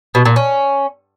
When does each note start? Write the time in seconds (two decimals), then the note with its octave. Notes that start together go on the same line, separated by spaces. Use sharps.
0.15 B2
0.25 A#2
0.36 C#4